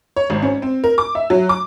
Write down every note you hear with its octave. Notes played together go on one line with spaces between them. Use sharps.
C#5
G#1
C#4
C4
A#4
D6
E5
F#3
D6